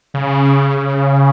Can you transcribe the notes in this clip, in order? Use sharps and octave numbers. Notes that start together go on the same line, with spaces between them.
C#3